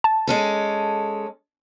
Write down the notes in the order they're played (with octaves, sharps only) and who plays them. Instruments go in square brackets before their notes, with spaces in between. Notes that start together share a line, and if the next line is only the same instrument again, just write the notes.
[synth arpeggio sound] A5
[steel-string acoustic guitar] G#3 C#4 A4